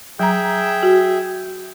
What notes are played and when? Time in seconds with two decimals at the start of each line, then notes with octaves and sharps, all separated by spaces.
0.19 F#3 G#4 E5 G5 A#5
0.83 F#4